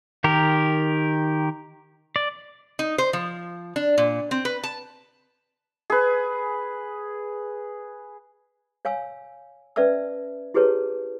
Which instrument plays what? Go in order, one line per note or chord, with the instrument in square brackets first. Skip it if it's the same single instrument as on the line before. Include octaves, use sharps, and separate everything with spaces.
[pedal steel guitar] D#3 G4 A#4
D5
[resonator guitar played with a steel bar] D#4
C5
F3
D4
A#2
C4
B4
A5
[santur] G#4 B4
[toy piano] C#5 F5 G#5 E6
C#4 B4 D5 E5 A5 E6
E4 G4 G#4 B4 C#5 A5